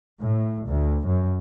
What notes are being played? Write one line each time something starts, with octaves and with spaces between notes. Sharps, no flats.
A2
D2
F#2